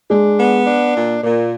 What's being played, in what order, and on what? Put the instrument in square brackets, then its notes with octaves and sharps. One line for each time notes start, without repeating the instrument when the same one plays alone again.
[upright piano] G#3 [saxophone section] D4
[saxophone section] B3
D4
A#2
A#2